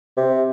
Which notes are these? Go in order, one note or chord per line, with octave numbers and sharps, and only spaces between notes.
C3